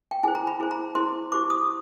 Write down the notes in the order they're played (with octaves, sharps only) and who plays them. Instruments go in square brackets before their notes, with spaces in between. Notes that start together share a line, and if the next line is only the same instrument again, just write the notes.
[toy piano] G5
E4 G#4 C5 G#5
A#5
B5
E4 G#4 C5
A#5
E4 G#4 C5 C6
E4 G4 C5 D6
D#6